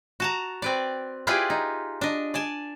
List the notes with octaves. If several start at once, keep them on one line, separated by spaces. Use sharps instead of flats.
F#4 A5 A#5
C4 B4 D5
E4 F4 G4 G#4 B4 D5
D#4
D4 D#5
D5 G#5 A5